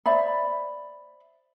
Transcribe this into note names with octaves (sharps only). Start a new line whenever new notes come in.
C5 D5 E5 B5